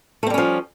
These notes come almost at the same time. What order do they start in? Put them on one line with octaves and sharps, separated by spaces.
A3 C4 G3 C#4 F3